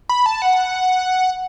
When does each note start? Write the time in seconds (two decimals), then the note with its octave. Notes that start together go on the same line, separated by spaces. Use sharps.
0.09 B5
0.26 A5
0.42 F#5